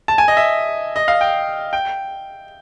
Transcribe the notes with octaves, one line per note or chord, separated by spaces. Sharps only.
A5
G#5
D#5
E5
D#5
F5
G5
G5